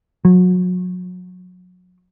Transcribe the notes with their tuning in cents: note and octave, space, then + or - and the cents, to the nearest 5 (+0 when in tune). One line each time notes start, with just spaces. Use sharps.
F#3 -30